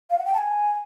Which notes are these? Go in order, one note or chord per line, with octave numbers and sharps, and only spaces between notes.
F5
F#5
G5
A5
G#5